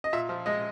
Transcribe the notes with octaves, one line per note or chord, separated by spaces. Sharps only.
D#5
A#2 E5
F3
G#3 D#5